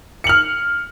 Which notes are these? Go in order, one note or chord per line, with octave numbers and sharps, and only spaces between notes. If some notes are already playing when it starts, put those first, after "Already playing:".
F6 C#7 F#7